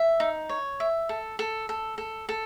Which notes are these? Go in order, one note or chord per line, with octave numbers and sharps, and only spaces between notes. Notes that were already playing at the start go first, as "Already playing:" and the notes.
Already playing: E5
D#4
C#5
E5
A4
A4
A4
A4
A4